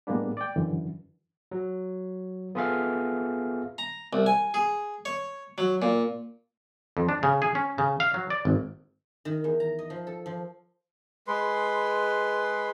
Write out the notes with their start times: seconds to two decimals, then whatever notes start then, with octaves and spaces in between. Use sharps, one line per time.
0.07 A2 G3 G#3 A#3 B3 D4
0.37 D5 G5
0.56 F#2 D3 E3
1.52 F#3
2.55 B3 F4 G#4 A4 E5 F5
3.78 A#5
4.13 C2
4.26 G#5
4.54 G#4
5.05 C#5
5.58 F#3
5.82 A#2
6.97 F2
7.09 D4
7.23 C#3
7.42 G#4
7.55 C#4
7.78 C#3
8.00 F5
8.14 F#3
8.30 D5
8.45 G#1
9.25 D#3
9.44 E2
9.60 A#5
9.79 D#5
9.90 F3
10.07 A4
10.26 F3
11.27 G#3 B4 C6